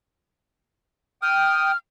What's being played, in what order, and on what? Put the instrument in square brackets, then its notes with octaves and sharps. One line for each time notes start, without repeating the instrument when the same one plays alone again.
[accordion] G5 D#6 [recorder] F6